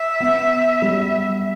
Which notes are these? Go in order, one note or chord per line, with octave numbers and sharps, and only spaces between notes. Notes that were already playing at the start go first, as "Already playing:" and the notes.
Already playing: E5
B3
G3